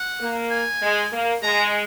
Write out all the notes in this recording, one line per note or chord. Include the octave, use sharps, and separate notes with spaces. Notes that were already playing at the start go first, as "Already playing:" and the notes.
Already playing: F#5
A#3
G#5
G#3
A#3
G#3 A#5